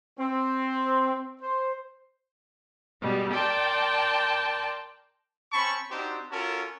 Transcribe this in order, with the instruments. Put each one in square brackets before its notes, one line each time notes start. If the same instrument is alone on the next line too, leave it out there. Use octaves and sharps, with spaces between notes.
[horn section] C4
C5
[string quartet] B2 G3 G#3
A#4 D5 G5 A5 C6
[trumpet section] C4 C#4 A5 B5 C#6
C4 D4 D#4 F#4 G4 C5
C#4 F4 F#4 A4 A#4 A5